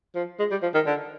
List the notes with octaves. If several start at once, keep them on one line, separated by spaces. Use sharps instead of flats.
F3
G#3
G3
F3
D#3
D3